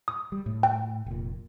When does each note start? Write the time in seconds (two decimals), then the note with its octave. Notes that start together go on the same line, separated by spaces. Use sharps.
0.08 D#6
0.32 G3
0.46 A2
0.63 G5
1.06 F1 A#2